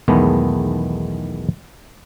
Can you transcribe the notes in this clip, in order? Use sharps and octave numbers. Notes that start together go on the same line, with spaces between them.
B1 E2 D#3 G#3 A3 B3